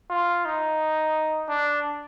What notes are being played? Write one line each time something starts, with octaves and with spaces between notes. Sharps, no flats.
F4
D#4
D4